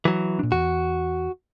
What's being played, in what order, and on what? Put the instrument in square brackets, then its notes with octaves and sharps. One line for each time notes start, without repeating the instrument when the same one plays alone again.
[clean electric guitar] E3 F#3
[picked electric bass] A#2 D4
[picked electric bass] E2 [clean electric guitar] F#4